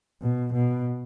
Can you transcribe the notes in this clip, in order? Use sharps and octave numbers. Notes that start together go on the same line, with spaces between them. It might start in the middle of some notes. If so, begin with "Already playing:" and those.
B2
B2